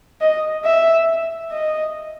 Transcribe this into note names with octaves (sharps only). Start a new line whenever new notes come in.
D#5
E5
D#5